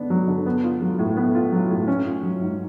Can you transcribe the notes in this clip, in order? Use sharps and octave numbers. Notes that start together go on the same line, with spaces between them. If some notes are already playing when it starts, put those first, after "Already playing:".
Already playing: D3 B3 D4
F#3
D3
B3
F4
F#3
A2
B3
F4
F#3
A2
C#4
F4
F#3
G#2